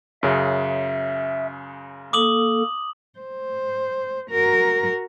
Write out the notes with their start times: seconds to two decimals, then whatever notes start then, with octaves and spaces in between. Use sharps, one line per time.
0.23 F#2 C#3 E5
2.13 A#3 A4 D6 D#6 F#7
3.19 C5
4.30 F#4 A#4